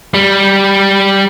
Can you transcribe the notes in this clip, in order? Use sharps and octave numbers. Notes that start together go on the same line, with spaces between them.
G3